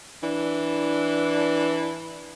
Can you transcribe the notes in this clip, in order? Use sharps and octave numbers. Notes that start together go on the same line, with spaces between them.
E3 D4